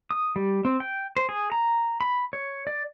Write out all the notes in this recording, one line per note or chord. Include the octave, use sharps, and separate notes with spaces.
D#6
G3
C4
G5
C5
G#4
A#5
B5
C#5
D5